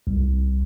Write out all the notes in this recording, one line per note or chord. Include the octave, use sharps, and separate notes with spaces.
C2